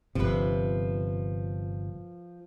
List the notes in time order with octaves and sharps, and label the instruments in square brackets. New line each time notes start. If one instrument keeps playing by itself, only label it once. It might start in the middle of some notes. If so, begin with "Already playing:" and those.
[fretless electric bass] G1 C3 [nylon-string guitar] F3 B4